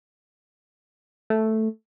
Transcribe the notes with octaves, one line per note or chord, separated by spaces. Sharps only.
A3